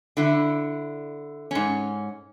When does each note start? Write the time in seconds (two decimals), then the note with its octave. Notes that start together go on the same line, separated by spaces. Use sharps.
0.17 D3 E4
1.51 G#2 C#4